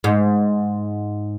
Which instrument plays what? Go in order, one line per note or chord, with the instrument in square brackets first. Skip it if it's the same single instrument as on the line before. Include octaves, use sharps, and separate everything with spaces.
[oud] G#2